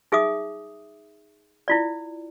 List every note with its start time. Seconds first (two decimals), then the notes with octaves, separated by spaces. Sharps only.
0.12 D#4 G#4 E5 D6 D#6
1.68 E4 F4 D5